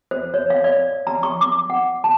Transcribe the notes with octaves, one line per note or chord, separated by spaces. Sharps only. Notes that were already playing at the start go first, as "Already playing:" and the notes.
C5
C#5
F5
D5
A#5
C#6
D6
F#5
A5